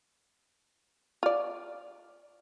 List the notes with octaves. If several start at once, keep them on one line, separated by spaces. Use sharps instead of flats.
F4 D5